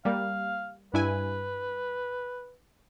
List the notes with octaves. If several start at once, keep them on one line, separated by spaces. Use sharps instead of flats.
G3 A#3 F5
G2 E4 B4 G#5